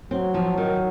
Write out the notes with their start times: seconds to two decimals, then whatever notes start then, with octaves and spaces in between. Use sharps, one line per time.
0.11 F#3 C4
0.34 F3
0.58 D#3